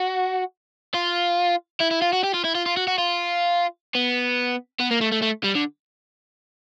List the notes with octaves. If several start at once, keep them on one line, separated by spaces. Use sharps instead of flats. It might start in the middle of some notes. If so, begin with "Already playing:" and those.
Already playing: F#4
F4
E4
E4
F4
F#4
G4
F4
E4
F4
F4
F#4
F#4
F4
B3
B3
A#3
A3
A3
A3
G3
D3